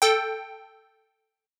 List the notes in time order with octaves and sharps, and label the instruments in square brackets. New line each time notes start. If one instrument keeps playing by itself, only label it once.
[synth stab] A4 G5